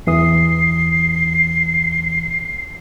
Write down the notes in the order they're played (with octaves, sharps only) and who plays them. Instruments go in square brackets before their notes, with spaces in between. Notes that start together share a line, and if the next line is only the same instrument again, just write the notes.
[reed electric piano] E2 E3 D#6 [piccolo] C7